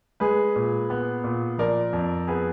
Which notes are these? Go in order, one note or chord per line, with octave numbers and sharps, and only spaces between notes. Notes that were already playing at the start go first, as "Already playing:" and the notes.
G#3 G#4 B4
A#2
B3
A#2
F3 A#4 D5
F2
B3 G#4 B4